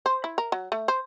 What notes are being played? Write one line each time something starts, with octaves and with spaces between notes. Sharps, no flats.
C5
E4
A#4
F#3
A3
C5